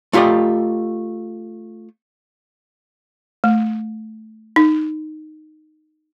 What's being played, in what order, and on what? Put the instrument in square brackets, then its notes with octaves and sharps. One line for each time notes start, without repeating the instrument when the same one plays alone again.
[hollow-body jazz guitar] A3 F4 G4 D5 D#5
[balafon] A3
D#4